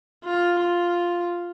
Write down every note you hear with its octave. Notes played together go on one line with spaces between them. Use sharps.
F4
F4